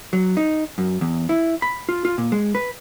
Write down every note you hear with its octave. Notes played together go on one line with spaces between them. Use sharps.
F#3
D#4
F#2
E2
E4
B5
F4
F4
A#2
G#3
B4